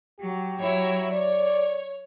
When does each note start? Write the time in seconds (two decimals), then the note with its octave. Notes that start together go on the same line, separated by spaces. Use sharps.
0.20 F#3 G4
0.58 F#3 E4 C#5
1.10 C#5 D5